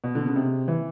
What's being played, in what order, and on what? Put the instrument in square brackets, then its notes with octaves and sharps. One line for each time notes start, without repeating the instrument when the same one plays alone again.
[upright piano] B2
D3
C#3
C3
E3